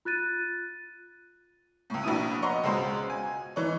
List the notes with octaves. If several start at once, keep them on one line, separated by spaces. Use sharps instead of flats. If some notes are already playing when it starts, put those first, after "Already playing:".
F4 F#6 A6 D#7
C#2 A2
A#1 B2 E4 D#6 D#7
B4 C#5 D#5 F#5 A#5 C6
C#2 B2 G#3 C5
G#5
E3 D#4 C#5